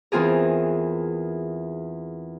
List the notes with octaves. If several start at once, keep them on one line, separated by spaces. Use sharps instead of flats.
E2 E3 C4 F4 G#4 A#4